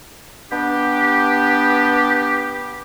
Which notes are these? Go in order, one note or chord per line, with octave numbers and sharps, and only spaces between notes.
B3 D4 G4